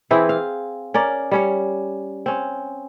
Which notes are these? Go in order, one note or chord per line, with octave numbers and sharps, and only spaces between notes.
E3 C4 E4 G#4
F5
C#4 A#4 D5
G3 C#4 C#5
C4 C#4